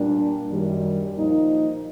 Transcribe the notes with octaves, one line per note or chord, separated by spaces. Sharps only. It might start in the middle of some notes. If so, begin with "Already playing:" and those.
Already playing: A#2 G3 A#3 D4
F#2 D#3 G3
A#2 F3 A#3 D#4